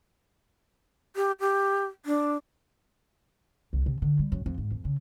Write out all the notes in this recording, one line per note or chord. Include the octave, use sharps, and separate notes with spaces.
G4
G4
D4
C2
C3
D3
G3
F#2
F2
G#2
F2
C#3